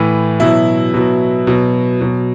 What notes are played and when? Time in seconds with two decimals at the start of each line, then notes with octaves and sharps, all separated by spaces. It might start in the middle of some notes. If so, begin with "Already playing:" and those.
Already playing: A2 E3
0.40 B2 F#3 E4
0.94 B2 F#3
1.47 B2 F#3
2.00 B2 F#3